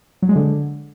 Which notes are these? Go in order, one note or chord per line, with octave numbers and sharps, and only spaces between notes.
F#3
G#3
D3